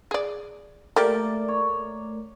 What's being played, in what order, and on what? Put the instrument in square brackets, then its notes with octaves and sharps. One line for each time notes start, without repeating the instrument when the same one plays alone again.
[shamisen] G#4 D5
[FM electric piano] A3 A#4 D5 [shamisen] A#3 G4
[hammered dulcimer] C#5